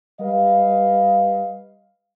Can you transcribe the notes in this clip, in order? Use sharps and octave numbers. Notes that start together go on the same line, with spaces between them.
G3 B4 D#5 F5